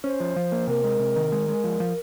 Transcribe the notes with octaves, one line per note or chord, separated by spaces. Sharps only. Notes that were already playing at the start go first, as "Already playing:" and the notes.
C#4 C5
F3
F3
A#3
C3 A#4
G#3
C3
D#3
G#3
G#3
F3
F3